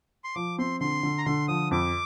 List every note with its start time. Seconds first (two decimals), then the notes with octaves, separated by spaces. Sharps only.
0.24 C6
0.35 F3 D6
0.58 C4 C6
0.80 D3 C6
1.03 D3
1.18 A#5
1.25 D3 C6
1.48 F3 D#6
1.71 F2 D6